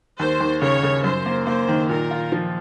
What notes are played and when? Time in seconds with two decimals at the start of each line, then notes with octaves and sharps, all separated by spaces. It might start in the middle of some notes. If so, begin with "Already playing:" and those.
0.19 D#2 C5
0.40 D#2
0.61 C#3 C#5
0.83 C#3
1.04 F#2 C5
1.26 A#3
1.46 A#3 C5
1.68 D#3
1.89 A#2 A#4
2.11 F4
2.32 F3